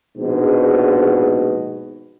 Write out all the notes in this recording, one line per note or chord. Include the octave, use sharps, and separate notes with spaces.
A#1 G#2 B2